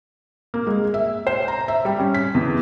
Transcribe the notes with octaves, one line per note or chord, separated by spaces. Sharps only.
A#3
G#3
E5
C5
A#5
E5
G3
C#4
B6
E2